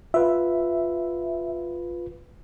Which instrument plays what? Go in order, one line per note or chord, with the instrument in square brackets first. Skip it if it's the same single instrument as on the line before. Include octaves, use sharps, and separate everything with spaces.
[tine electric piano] F4 B4 [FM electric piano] E5